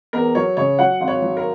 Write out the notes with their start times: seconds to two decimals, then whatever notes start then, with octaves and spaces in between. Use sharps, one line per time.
0.13 E2 A#4
0.35 F#3 C#5
0.57 C#3 C#5
0.79 F#3 F#5
1.01 G#1
1.08 C#5
1.22 F#3
1.37 A#4